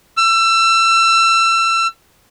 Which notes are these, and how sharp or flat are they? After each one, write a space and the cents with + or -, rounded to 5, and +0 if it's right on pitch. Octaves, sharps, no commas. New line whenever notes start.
E6 +30